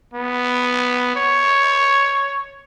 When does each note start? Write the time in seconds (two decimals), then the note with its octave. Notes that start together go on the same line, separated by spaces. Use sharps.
0.14 B3
1.16 C#5